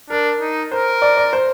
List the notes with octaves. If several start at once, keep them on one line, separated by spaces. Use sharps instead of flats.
D4 A#4
D#4
A#4 C5
D5
D5
C5